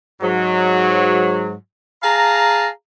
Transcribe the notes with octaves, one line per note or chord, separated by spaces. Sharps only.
G#2 F#3
G#4 F5 A5 A#5